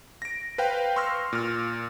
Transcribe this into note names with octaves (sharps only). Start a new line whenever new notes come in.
A#6 D7
B4 C5 F5 G5
C6 C#6 E6 F6 A#6
A#2 F6